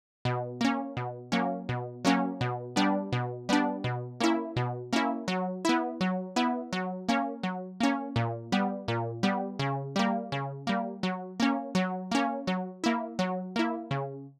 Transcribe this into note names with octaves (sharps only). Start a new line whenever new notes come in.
B2
A#3 C#4
B2
F#3 A#3 C#4
B2
F#3 A#3 C#4
B2
G3 B3 D4
B2
G3 B3 D4
B2
A#3 C#4 E4
B2
A#3 C#4 E4
F#3
B3 E4
F#3
B3 E4
F#3
A#3 C#4
F#3
A#3 C#4
A#2
G3 B3
A#2
G3 B3
C#3
G3 A#3
C#3
G3 A#3
F#3
A#3 C#4
F#3
A#3 C#4
F#3
A#3 E4
F#3
A#3 E4
C#3